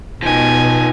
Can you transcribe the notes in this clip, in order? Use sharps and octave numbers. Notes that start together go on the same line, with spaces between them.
B2 F3 D#4 G#5